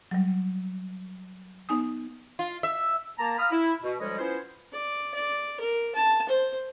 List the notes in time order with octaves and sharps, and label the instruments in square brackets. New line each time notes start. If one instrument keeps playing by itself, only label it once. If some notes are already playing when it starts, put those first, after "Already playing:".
[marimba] F#3 G3
B3 D#4 G#5 D#6
[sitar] F4
E5
[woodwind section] A#3 A5 A#5
F5 A#5 B5 D#6 F6
E4
B2
D2 F3 G3 G#3 C#5 D#5
B3 C#4 E4 F4 C5
[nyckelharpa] D5
D5
A#4
A5
C5